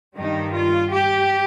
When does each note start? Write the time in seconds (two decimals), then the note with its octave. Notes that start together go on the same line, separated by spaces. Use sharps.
0.16 G2 D#3 G3 D#4
0.54 F4
0.91 G4